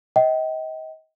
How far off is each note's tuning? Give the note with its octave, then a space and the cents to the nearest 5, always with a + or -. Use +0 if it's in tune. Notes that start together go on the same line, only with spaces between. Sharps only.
D#5 +35 G5 -30